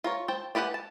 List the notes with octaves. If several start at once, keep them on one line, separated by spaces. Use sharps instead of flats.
F4 A#4 C#5
C5 G5 A5
D4 G4 B4 F#5 G#5
A5